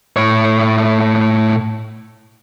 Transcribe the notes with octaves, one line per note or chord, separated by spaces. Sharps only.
A2 C#5